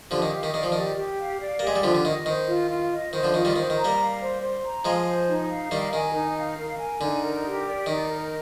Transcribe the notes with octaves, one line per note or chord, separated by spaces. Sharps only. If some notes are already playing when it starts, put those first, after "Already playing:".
D3 F3 G4
D#3
F5
D#3
D#3 D5
F3
D#3 G4
G4
F5
D5
A#3 G4
G#3
G3
D3 F3 F4
D3
D#3 D#5
D#3 C5
F4
F4
D#5
D#3 C5
D3 F3
D#3 F4
D#3 G3
D#3 C5
D#3
A#5
G3 A#3
F5
C5
C5
A#5
F3 G#3 F5
C5
D#4
F5
D#3 G3 A#4
D#3 G#5
D#4
F5
A#4
G#5
D3 D#4
A#4
G4
D5
D#3 D#4
A#4